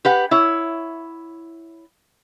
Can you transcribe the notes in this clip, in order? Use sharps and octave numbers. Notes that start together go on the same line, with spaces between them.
G4 B4 F#5
E4 C#5